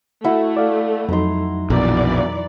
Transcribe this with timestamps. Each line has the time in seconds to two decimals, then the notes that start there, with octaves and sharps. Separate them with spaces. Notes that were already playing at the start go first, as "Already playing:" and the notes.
0.24 A3 E4 F#4 F#5
0.57 D5 F5
1.09 F2 F#3 D#4 A#5 C6
1.70 A#1 B2 E3 A#4 D5